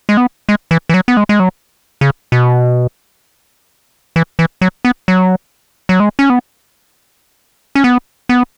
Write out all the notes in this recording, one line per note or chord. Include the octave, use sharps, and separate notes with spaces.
G#3
B3
G#3
E3
E3
F#3
B3
G#3
G#3
F#3
C#3
B2
E3
E3
F#3
B3
F#3
F#3
G#3
C#4
B3
C#4
B3
B3